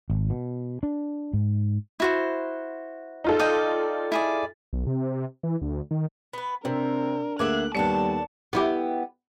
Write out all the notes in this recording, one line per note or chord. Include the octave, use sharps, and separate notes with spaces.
G#1
B2
D4
G#2
E4 F#4 C5
D#4 F4 A4
D5 D#5 G5
E4 G#4 D5
B1
C3
E3
D2
D#3
B3 B4
C3 C4 D4 A#4
D2 A#3 G#4 E5 F#5 D6 F#6
D#2 G3 B3 D4 A4 C#5 A5 C#7
B3 E4 G4